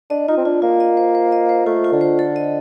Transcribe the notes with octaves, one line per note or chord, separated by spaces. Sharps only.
D4 D#5
D#4 F4
C4
D4 F4
A#3 F4
D#5
C5
C5
D#5
C5
A3 F4
F4
D3
C5
A4
D#5